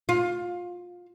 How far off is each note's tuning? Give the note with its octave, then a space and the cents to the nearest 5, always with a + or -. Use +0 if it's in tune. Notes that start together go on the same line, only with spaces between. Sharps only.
F4 +20